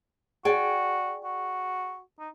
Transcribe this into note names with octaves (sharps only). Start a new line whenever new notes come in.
F#4 G#4 D5 G5
F#4
D#4